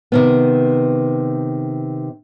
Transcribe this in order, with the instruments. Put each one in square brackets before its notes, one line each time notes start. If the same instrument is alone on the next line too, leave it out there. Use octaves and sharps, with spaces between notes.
[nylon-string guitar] C3 D#3 B3